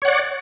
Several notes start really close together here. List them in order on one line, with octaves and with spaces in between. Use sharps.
C#5 F#5 D5